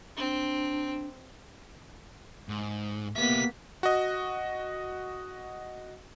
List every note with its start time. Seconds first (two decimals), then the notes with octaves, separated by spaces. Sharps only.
0.17 C4 D4
2.49 G#2
3.16 A#3 B3 G4 E5 B6
3.83 F#4 D#5